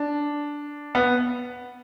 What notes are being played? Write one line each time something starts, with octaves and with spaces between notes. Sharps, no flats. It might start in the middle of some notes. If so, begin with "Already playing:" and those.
Already playing: D4
B3